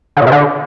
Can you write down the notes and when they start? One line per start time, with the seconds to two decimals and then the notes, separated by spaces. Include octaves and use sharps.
0.17 D3
0.22 A#2
0.27 C3
0.32 D3